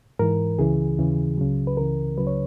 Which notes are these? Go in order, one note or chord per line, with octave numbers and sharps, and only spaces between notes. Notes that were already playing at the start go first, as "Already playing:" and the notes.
G#2 E3 A#4
C#2 C#3 E3 G#4
D#2 C#3 E3
C#2 C#3 F#3
B4
C#2 C#3 E3 A#4
C#2 C#3 F#3 B4
C#5